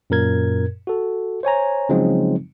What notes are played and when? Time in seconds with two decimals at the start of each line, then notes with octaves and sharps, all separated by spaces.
0.10 F#2 A#2 A#4 G#6
0.87 F#4 A4
1.43 C5 C#5 G#5 A#5
1.89 C#3 F3 F#3 G#3 C4 D#4